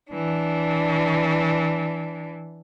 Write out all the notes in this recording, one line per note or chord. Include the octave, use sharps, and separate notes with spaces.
E3 D4